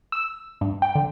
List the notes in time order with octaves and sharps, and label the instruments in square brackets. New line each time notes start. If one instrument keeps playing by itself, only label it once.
[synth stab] E6
G2
G5
D3